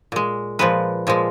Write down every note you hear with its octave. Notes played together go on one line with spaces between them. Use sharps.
A#2 G#3
A#2 F3 G#3 B4
A#2 F3 G#3